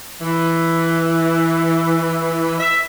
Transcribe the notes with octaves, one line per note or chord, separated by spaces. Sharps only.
E3
E5